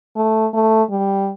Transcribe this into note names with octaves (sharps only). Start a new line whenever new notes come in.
A3
A3
G3